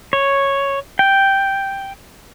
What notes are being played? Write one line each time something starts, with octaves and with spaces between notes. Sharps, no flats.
C#5
G5